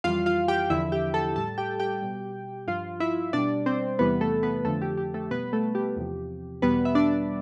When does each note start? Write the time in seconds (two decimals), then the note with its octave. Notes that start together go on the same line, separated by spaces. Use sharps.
0.04 F2 E3 G3 F4 F5
0.26 F4 F5
0.48 G4 G5
0.70 E2 D3 F3 E4 E5
0.92 G4 G5
1.14 A4 A5
1.36 A2 G3 A4 A5
1.58 G4 G5
1.80 G4 G5
2.02 B2 G3
2.67 G2 F3 F4 F5
3.00 E4 E5
3.33 B2 G3 D4 D5
3.66 C4 C5
3.99 E2 C3 E3 G3 B3 B4
4.21 A3 A4
4.43 B3 B4
4.65 F2 D3 F3 A3 A4
4.82 G4
4.97 G4
5.14 A3 A4
5.30 B2 G3 B3 B4
5.53 A3 A4
5.75 G4
5.96 E2 C3 F3
6.62 E2 B2 G3 B3 B4
6.85 E5
6.95 D4 D5